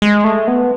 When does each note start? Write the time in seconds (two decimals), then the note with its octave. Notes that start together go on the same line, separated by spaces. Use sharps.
0.02 G#3
0.24 A3
0.48 B3